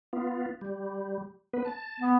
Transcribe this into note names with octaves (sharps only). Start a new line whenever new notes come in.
B3 F4
G3
B3 B4
A5
B3